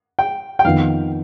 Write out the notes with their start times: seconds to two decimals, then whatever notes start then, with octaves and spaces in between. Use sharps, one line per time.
0.19 G5
0.59 G5
0.64 F2 D#3 B3 D#4 F5